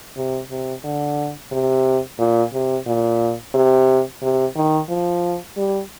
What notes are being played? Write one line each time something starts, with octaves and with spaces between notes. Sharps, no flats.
C3
C3
D3
C3
A#2
C3
A#2
C3
C3
D#3
F3
G3